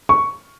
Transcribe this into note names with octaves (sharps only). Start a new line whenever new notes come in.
C#6